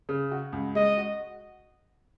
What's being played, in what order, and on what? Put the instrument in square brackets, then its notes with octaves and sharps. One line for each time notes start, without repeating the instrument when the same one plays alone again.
[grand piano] C#3
F#4
C#2
[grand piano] G#3 [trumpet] D#5
[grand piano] F#4